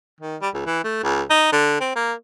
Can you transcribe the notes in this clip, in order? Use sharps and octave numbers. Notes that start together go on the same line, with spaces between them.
D#3
G3
C#2
E3
A3
C#2
D#4
D3
C4
A#3